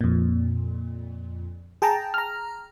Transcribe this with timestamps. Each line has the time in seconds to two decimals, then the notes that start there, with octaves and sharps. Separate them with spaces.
0.01 F2 A#2
1.82 G#4 G5 A5 A#5
2.14 A#5 F6